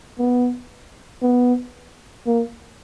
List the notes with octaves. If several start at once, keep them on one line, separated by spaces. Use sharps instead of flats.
B3
B3
A#3